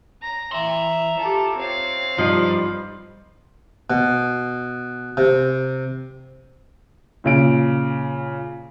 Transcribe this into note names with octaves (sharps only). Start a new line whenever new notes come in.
A#5
E3 E5 A#5 C6
F4 G4 A4
C4 C#5 F5
G2 F3 G3 D#4
B2
C3
A#2 C#3 D7